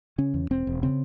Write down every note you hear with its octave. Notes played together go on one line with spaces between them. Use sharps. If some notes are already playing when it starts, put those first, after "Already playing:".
C#3 C#4
E2
E1 C4
E1
C#3 C4